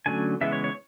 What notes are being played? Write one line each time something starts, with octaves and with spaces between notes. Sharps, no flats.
D3 F#3 A3 C#4 G#5
C#3 E3 G#3 B3 E5
C#5
C#5